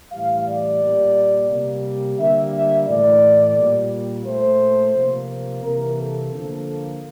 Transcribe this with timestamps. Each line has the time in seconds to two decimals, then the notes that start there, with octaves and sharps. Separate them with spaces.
0.13 A2 E3 G3 F5
0.48 D5
0.81 A#2 G3 A#3
1.51 C3 G3 A#3
2.20 D3 G3 A#3 E5
2.54 E5
2.88 A2 E3 A3 D5
3.57 A#2 G3 A#3
4.26 A#2 A3 C5
4.95 C3 F3 A#3
5.64 C3 E3 A#3 A#4
5.99 A4
6.33 D3 F3 A#3